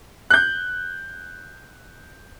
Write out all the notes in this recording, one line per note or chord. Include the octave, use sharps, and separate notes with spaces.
F#6 G6